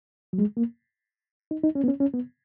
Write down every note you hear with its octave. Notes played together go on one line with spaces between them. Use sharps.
F#3
G#3
A#3
D#4
D#4
C#4
B3
C#4
C#4
B3